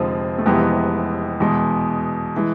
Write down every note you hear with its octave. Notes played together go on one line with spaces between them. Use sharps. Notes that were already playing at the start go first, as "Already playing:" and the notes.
Already playing: F1 F2 D3 F3 G#3 C4
A3
F1 F2 C3 E3 G#3 B3
E2 B2 G#3
E3 G#3